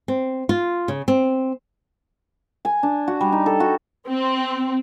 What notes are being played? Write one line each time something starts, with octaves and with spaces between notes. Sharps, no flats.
C4
F4
C#3
C4
G#5
D4
F#4
G3
D#4
A4
F#4
C4